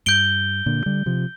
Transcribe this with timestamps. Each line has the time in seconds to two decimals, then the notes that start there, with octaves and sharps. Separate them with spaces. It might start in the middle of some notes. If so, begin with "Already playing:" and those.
0.06 G2 G6 D7 G7
0.66 A#2 D3
0.86 D3 G3
1.06 C3 F3